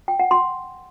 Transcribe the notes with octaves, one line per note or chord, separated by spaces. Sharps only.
G5
F#5
C6